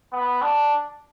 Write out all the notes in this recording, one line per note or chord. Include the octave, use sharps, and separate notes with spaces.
B3
D4